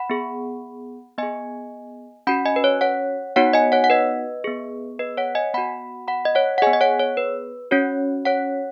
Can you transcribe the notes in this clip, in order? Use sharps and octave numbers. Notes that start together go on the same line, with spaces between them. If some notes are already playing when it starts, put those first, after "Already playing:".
Already playing: F#5 B5
B3 G#4
B3 G#4 D#5 G#5
C#4 F#4 F#5 B5
D#5 G#5
B4
C#5
C#5 F#5
B3 D#4 F#4 C#5 F#5
D#5 G#5
C#5 F#5
F#5
B4 D#5
B3 G#4
B4 D#5
C#5 F#5
D#5 G#5
B3 F#4 F#5 B5
F#5 B5
D#5
C#5 F#5
F#5
B3 G#4 D#5 G#5
D#5
C#5 F#5
C#5
B4
C#4 F#4 C#5
C#5 F#5